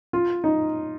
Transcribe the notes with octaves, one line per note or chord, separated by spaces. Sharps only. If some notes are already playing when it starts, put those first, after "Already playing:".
F4
D#4